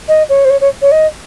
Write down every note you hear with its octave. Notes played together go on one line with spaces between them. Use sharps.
D#5
C#5
C5
C#5
C#5
C#5
D#5